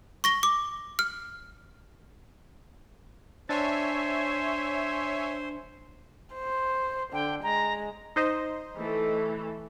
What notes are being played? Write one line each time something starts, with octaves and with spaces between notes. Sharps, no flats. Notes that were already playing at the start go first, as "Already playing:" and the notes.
C#6 A#6 G7
D6
F6
D4 C5 C#5 E5 G#5 A6
C5
D3 G5
G#3 A#5
D#4 C5 D#5
E3 A3 A4